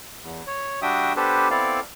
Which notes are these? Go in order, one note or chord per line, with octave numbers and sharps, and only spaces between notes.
E2
C#5
G3 D4 F#4 E5 G5 D#6
B3 D4 G4 A4 B4 C5
B3 C4 E4 A4 D5 F5